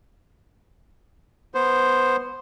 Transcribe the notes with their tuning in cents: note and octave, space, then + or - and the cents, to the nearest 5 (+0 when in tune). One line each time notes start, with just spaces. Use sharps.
B3 +0 C5 +0